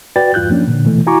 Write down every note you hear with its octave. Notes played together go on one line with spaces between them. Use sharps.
F#4 B4 D5 G5 A6
E2 G2 F4 F#6 G6
F3 A#3 C#4 D4
A#2 D3
B2 E3 A3
E4 F#4 G#5 A#5 C#6 D6